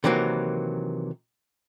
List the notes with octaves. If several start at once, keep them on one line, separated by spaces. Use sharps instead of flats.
C3 D#3 E3 F#3 A#3